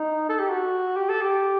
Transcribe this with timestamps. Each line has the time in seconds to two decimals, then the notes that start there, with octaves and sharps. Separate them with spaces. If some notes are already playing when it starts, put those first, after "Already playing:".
Already playing: D#4
0.29 A4
0.39 G4
0.49 F#4
0.96 G4
1.10 A4
1.22 G4